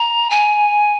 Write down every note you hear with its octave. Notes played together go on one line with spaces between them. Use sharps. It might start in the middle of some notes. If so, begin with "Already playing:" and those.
Already playing: A#5
G#5